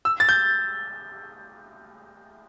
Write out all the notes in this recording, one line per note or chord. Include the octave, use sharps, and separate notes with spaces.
E6
A6
G6